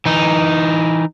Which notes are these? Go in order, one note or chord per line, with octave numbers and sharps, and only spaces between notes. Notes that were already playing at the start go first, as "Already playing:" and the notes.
E3 D#4